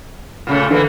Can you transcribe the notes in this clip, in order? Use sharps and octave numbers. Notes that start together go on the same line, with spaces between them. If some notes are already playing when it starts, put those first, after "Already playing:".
A#2 C#3 A3
D3 E3 A#3